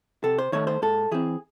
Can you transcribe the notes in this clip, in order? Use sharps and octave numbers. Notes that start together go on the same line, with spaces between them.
C3 A4
C5
D#3 A3 C#5
C5
G#2 A4
E3 C4 G#4